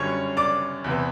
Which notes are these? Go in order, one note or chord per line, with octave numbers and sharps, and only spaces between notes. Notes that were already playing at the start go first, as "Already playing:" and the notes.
Already playing: F#2 D3 G3 C#5 C#6
D5 D6
E2 C3 E3